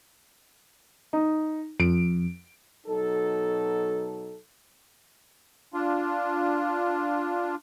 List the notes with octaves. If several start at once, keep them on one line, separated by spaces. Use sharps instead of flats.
D#4
F2 D7
B2 F#3 D#4 A4
D4 F4